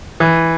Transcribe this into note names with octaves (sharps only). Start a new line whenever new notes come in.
E3